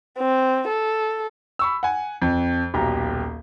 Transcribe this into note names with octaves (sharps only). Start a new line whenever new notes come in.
C4
A4
B5 C#6 E6
F#5 G#5
F2
D#1 B1 G4 A#5